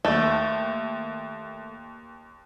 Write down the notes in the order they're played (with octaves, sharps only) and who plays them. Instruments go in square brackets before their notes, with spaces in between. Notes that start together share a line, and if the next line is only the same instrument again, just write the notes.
[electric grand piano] D#2 [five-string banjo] A3